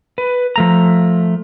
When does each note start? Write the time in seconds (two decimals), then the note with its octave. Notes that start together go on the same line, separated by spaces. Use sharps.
0.18 B4
0.56 F3 A3 A#5